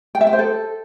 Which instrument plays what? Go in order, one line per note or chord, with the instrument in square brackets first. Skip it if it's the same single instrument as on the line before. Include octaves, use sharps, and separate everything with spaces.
[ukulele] G5
E5
G5
C5
A4